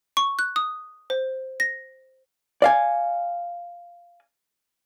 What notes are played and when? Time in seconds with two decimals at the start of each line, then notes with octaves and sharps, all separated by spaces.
0.17 C#6
0.39 F#6
0.56 D#6
1.10 C5
1.60 A#6
2.62 D5 F5 G#5